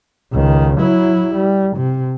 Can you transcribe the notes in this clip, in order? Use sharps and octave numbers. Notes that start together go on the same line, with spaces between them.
C#2 D#3
F#3 E4
G3
C3